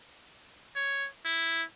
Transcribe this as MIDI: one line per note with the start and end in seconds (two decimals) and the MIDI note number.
0.76 1.08 73
1.25 1.63 64